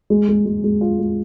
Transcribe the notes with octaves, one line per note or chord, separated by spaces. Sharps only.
G#3
G#3
G#3
G#3
F4
G#3